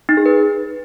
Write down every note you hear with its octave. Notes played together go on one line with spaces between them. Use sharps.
D#4
G#4
B4